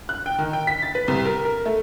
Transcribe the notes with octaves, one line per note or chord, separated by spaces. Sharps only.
F#6
G5
D#3
G5
B6
A6
B4
C2
A#4
A#4
A3